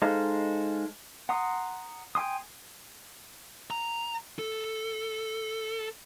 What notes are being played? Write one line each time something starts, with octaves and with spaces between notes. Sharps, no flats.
G#3 D#4 A4 C5 F5
F#5 A#5 C6 D#6
G5 G#5 C6 D#6
A#5
A4